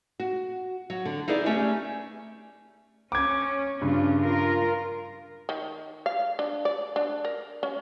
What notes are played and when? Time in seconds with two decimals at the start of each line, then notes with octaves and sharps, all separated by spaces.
0.20 F#4
0.90 F#3
1.05 D3
1.28 D#4 E4 G#4 B4 D5
1.46 A3 C#4 G4
3.12 C#4 D6 G#6
3.81 G2 C#3 C#4 F4
4.21 F4 A#4
5.49 D#3
6.06 F5
6.39 D4
6.65 D5
6.96 D4
7.25 A#4
7.63 C#4